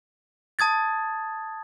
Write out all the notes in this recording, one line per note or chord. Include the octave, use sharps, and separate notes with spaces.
A5 D#6 G#6 A6